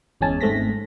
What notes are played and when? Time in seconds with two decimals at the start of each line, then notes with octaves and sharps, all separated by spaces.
0.21 G1 E2 G#3 C#4 G#5 A5
0.41 G#1 G#2 A3 C4 A#6 B6